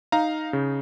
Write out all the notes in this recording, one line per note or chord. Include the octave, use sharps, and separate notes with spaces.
D#4 F5 A#5
C#3